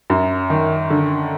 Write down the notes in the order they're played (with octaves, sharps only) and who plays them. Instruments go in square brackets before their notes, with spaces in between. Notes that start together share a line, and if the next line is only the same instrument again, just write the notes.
[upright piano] F#2
D#3
D3